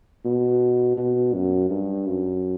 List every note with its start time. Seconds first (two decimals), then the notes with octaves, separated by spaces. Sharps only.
0.24 B2
0.97 B2
1.34 F#2
1.70 G2
2.07 F#2